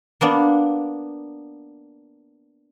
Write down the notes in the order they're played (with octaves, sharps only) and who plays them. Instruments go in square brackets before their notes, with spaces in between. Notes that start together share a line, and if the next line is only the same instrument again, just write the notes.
[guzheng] A#3 B3 D4